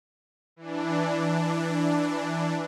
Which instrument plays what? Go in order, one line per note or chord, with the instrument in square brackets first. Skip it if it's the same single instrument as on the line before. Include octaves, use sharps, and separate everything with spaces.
[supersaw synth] E3 D4